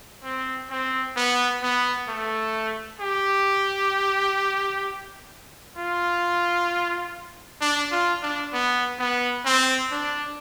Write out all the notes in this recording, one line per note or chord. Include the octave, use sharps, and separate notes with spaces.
C4
C4
B3
B3
A3
G4
F4
D4
F4
D4
B3
B3
C4
D4